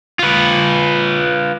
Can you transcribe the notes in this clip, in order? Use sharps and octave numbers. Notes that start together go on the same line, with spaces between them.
F4 B4